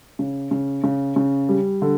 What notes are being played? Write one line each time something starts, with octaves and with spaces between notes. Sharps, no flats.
C#3
C#3
C#3
C#3
G3
D3